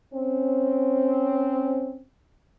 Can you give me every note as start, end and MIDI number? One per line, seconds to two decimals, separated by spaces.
0.13 2.02 60
0.13 2.02 61